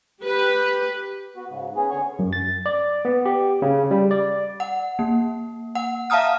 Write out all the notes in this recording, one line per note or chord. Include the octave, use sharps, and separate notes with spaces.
G4 B4
B3 F#4
G#2 C#3
B3 C#4 G#4
D3 C#5 C#6
F#2
A6
D5
B3
G4
C#3
G3
D5
F#5
A#3
F#5
E5 F5 A5 A#5 D#6 F6